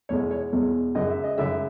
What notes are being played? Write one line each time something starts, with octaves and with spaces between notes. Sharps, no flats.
E2 B2 G#3 C#5
C#5
E2 B2 G#3
F#2 C#3 G#3 D#5
E5
D#5
F#2 C#3 G#3 E5